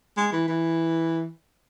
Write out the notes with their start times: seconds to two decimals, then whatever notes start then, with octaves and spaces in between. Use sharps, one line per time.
0.17 G#3
0.33 E3
0.48 E3